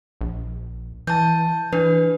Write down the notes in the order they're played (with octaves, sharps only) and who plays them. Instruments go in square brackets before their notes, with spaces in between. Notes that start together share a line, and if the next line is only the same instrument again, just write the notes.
[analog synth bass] A#1
[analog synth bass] E3 [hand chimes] A5 G6
[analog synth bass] E3 [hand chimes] D4 B4